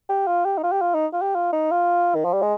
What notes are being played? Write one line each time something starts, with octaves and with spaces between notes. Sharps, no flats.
G4
F4
G4
D#4
F4
G4
F4
D#4
F4
G4
F4
D#4
F4
D#3
F3
G3
G#3